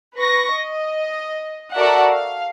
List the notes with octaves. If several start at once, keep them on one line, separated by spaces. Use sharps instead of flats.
B4 C#6 A#6
D#5
F#4 A4 A#4 D5 E5 F#5
F5